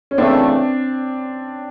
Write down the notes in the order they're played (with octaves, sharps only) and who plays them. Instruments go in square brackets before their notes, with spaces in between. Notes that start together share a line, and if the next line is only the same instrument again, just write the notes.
[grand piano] C#4
[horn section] C#3 E3 A3 [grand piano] C4 D4